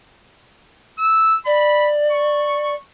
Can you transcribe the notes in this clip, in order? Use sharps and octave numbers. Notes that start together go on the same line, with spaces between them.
E6
D5 B5
C#6